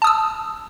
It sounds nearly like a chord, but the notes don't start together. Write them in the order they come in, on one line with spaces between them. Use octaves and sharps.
A5 D#6 E6